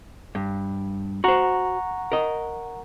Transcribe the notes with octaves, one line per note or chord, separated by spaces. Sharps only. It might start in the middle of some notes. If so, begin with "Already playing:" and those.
G2
F#4 C5 F#5 A#5 C#6
A#4 D#5